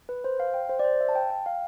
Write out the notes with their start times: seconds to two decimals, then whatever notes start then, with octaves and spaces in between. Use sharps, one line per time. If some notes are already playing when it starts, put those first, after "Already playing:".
0.09 B4
0.24 C5
0.40 F5
0.54 G5
0.69 C5
0.79 D5
0.84 C5
1.01 E5
1.09 A5
1.15 G5
1.30 G5
1.46 F5